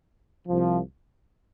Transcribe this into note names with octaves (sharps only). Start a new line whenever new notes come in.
C2 C3 F3